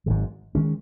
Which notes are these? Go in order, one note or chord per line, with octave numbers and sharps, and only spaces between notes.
G#1 G#2 D#3 F#3
D#3 G#3 C#4